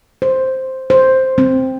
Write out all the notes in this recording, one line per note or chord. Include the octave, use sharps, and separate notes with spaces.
C5
C5
C4